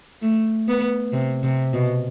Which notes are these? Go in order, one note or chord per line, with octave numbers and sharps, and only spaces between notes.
A3
B3
C3
C3
B2